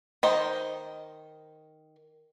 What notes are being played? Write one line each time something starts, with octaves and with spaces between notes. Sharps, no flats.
D#3 C5 D#5